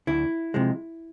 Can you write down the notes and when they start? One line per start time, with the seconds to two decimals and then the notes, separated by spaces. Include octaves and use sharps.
0.07 D2 E4
0.54 C3 F3 G#3